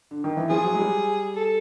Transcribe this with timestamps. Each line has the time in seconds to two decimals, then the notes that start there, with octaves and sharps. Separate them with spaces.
0.11 D3
0.24 D#3
0.37 E3
0.49 F3 G#4
0.64 F#3
0.74 G#3
0.79 G3
1.36 A4